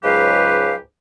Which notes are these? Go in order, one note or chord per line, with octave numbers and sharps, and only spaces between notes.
C#2 G#2 F#3 G4 B4 F5